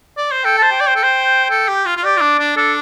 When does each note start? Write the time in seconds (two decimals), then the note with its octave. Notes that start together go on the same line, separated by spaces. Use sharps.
0.17 D5
0.32 C5
0.45 A4 G5
0.58 C5 A5
0.71 G5
0.81 D5
0.88 C5
0.96 A4
1.03 C5
1.51 A4
1.68 G4
1.86 F4
1.97 F4
2.04 G4 D5
2.17 F4
2.21 D4
2.40 D4
2.56 D4 A4